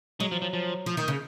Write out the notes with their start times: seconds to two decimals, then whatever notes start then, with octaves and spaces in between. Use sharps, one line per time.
0.20 F#3 G#3
0.32 F3
0.42 F3
0.53 F3
0.86 F3
0.97 D#3
1.08 C#3